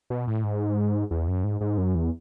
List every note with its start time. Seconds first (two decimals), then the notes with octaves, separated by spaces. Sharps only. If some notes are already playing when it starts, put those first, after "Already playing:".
0.10 B2
0.27 A2
0.44 G#2
1.11 E2
1.28 F#2
1.44 G#2
1.61 G#2
1.78 F#2
1.95 E2